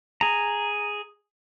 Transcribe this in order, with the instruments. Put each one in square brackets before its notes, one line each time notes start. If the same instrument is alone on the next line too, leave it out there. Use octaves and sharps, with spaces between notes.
[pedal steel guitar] G#4 A#5